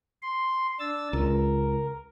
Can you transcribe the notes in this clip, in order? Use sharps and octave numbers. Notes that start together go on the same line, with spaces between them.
C6
D4 E6 A6
C#2 A#4